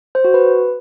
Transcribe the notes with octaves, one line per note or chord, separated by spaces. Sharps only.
C5
F#4
B4